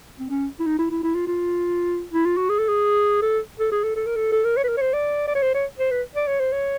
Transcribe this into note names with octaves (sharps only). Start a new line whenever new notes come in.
C4
C#4
E4
D#4
E4
E4
E4
F4
F4
E4
F4
F#4
G#4
A4
G#4
A4
A4
G#4
A4
A4
A#4
A4
A4
A#4
C#5
B4
A#4
C#5
C5
D5
D5
C#5
C5
C#5
C5
B4
D5
C#5
C5
C#5